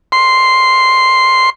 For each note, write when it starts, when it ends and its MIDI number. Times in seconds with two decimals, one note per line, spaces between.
0.12 1.50 84